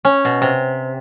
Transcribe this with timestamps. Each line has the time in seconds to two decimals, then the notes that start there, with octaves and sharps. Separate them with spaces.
0.05 C#4
0.25 B2
0.42 C3